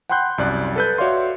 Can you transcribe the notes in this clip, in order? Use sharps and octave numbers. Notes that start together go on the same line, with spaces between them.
F#5 G5 B5 C6 F#6 G6
C2 F#2 D5 F#6
A4 B4 G6
F#4 C#5 D5 E5 F5 C6